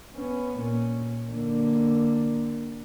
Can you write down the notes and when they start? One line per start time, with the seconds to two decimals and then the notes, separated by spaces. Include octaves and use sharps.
0.13 B3 C#4
0.59 A#2 C#4
1.31 D3 A#3